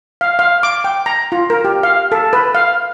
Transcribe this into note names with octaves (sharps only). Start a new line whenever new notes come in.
F5
F5
D6
G5
A#5
F4
A#4
G4
F5
A4
B4
F5